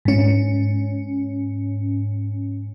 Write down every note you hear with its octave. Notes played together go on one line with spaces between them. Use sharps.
G#2 C#4